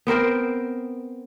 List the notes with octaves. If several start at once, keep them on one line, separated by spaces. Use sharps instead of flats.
B3 C4 A#4 C5